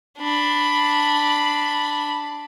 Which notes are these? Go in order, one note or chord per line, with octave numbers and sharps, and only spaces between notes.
D4 B5